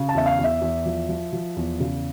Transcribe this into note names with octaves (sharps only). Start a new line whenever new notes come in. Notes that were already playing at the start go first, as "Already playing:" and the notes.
Already playing: C#3
A5
E2 E5
F5
E2
E5
E2
F3
F3
F3
E2
C#3